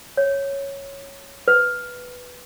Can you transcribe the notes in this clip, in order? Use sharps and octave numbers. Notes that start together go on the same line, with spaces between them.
C#5
B4